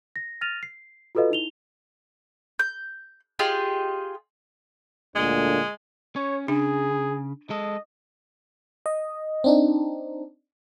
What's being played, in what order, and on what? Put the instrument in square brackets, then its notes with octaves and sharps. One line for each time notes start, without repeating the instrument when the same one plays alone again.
[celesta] A#6
F6 A6 A#6 D#7 F7
C7
F4 F#4 A4 B4 D#5 F5
D#4 E4 F7 G7
[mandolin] G6
F4 G4 G#4 D#5
[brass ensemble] D2 A#2 D3 [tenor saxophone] G#3
[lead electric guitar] C#4 [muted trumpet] C#5
[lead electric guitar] C#3 [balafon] D4 [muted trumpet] G#4
[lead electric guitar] G#3 A4 [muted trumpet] D#5
[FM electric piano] D#5
C4 D4 D#4